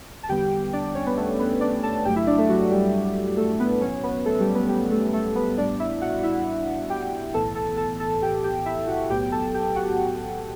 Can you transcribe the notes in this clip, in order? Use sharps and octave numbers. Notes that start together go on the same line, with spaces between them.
A5
E2 D3 G3 B3 G4 G5
D4 D5
C#4 C#5
B3 B4
A3 A4
B3 B4
D4 D5
A4 A5
G1 G2 F#3 A3 G4 G5
E4 E5
D4 D5
A3 A4
F#3 F#4
G3 G4
A3 A4
B3 B4
B1 A2 F#3 B3 C#4 C#5
B3 B4
A3 A4
G3 G4
B3 B4
G3 G4
A3 A4
A3 A4
B3 B4
A1 A2 G3 B3 D4 D5
E4 E5
F#4 F#5
E4 E5
G4 G5
B1 A2 E3 B3 A4 A5
A4 A5
A4 A5
A4 A5
G4 G5
G4 G5
E4 E5
F#4 F#5
B1 A2 F#3 B3 G4 G5
G5
A4 A5
G4 G5
F#4 F#5